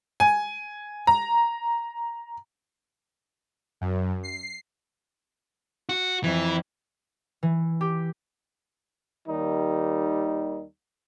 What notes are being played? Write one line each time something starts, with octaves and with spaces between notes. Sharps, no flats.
G#5
A#5
F#2
C7
F#4
F2 E3
E3
G4
D#2 D#3 G3 D#4